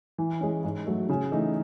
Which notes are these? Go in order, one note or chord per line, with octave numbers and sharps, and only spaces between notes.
E3
G#3 C#4
G#2
F#3 A3
C#3
E3 A3 D#4